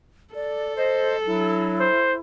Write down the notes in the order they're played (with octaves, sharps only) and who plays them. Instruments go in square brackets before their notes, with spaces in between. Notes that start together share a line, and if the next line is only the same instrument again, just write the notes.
[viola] A4 [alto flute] D5
[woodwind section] C5 [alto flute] D#5
[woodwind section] F#3 D4 [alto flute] E4
[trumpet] C5